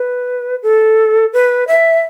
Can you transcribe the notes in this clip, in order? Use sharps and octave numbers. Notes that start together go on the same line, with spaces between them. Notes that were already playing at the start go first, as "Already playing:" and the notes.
Already playing: B4
A4
B4
E5